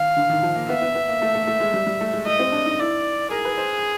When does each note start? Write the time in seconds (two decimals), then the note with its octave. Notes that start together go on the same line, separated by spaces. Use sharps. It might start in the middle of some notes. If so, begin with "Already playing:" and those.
Already playing: D#3 F5
0.17 D3
0.29 D#3
0.43 F3
0.56 A#3
0.69 B3 E5
0.82 B3
0.95 B3
1.09 A#3
1.22 A3
1.35 A3
1.47 A3
1.60 G#3
1.74 G3
1.87 G3
2.01 A3
2.13 G#3
2.26 A3 D#5
2.39 C4
2.52 D4
2.66 D#4
2.79 E4 D5
3.31 G#4 A#4
3.45 B4
3.58 C5